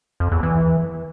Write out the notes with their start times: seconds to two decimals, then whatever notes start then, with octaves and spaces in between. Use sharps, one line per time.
0.20 F2
0.32 E2
0.43 E3